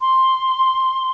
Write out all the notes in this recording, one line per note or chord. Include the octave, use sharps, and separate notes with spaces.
C6